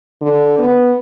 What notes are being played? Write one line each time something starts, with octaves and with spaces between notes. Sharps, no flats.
D3
B3